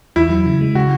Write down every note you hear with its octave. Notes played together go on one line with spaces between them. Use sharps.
E2 E4
F#3
C#3
G#3
C#3 F#4